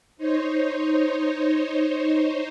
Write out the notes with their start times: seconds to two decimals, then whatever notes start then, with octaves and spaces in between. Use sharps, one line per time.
0.17 D#4 C5 C#5